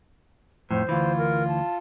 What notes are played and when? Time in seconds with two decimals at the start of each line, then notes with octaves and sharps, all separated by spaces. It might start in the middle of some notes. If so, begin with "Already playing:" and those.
0.71 F2 A2 C5
0.89 D2 E3 F4
1.18 A#4
1.48 A5